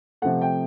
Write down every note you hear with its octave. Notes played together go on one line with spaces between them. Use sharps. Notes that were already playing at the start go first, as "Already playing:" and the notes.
C3 F3 A3 F#5
G5